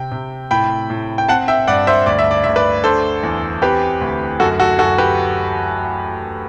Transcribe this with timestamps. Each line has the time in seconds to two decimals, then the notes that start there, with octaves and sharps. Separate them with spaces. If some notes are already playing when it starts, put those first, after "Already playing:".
Already playing: C3 G5
0.12 C3
0.51 A2 G5 B5
0.90 A2
1.18 G5
1.28 C4 F#5 A5
1.48 E5 G5
1.67 G2 D5 F#5
1.87 C5 E5
2.06 D2 D5
2.19 E5
2.31 D5
2.44 D2 E5
2.56 B4 D5
2.84 D4 A4 C5
3.23 E2
3.62 C4 G4 B4
4.01 D2
4.40 F#2 F#4 A4
4.60 F#4 A4
4.79 F#2 F#4 A4
4.98 G4 B4